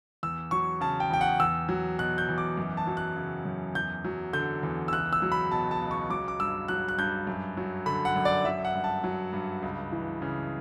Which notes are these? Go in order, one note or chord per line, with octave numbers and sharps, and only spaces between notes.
E2 E6
F#3 C#6
C#3 A5
G5
E2 G5
F#5
E2 E6
F#3
B2 F#6
G6
E2
D6
F#2
A5
F#3
F#6
C#3
F#2
E2 G6
F#3
D3 G6
E2
E6
C#2 F#6
E6
F#3
B5
B2 A5
A5
C#2
C#6
F#3 D6
D6
G2 E6
F#3 F#6
F#6
G2 G6
F#2
F#3
D3 B5
F#5
F#2
D5
F#3 E5
F#5
G2
A5
F#3
G2
C#2
E3
C#3